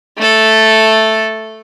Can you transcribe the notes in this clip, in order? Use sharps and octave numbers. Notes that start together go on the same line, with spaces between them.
A3 A4